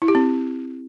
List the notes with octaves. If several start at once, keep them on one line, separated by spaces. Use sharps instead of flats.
E4
G4
C4